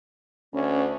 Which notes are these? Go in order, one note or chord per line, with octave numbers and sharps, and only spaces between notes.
D2 C#4